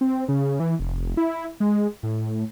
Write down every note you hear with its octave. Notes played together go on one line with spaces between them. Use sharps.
C4
C#3
E3
F1
E4
G#3
A2